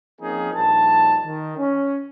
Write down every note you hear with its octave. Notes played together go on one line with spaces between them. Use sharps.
F3 A#3 C4 C#4 D#4 G#4
A#1 G2 D#4 A5
D#3
C#4